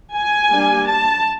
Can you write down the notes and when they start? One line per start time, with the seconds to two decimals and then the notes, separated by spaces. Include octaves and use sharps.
0.15 G#5
0.51 G3 A#3 D4
0.88 A5